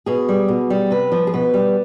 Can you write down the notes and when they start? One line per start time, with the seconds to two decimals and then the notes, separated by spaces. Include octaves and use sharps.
0.06 B2 G#4
0.29 G3
0.48 B2
0.70 G3
0.90 C3 B4
1.12 F3
1.27 G#4
1.34 B2 B4
1.54 G3